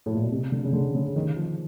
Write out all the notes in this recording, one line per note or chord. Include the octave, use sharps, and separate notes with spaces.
A2
A#2
B2
C3
D3
C#3
D3
C#3
D#3
F3